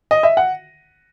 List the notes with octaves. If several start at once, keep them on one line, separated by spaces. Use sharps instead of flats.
D#5
E5
F#5